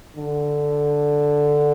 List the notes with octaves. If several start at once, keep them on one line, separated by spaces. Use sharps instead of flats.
D3